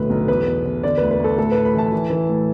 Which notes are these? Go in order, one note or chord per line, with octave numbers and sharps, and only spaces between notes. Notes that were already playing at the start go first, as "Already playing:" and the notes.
Already playing: B1 A2 D3 B4
B1
E2 B4
E2
E2
D3 D5
D2 B4
B4
D2 A4
A2 A4
A2 B4
B5
E3 A5
E3
E3
A2